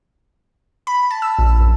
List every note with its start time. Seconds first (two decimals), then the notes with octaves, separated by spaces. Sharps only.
0.87 B5
1.11 A5
1.22 E6
1.39 A#1
1.60 F#2